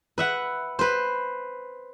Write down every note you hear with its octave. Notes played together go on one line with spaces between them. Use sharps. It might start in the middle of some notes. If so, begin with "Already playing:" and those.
B4 E5 F#5
B4 C5